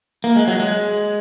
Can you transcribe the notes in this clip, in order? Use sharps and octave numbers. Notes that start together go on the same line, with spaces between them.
A#3
G#3
F#3
G#3